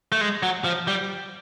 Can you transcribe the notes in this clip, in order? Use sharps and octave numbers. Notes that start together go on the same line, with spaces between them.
A3
G#3
F#3
F3
G3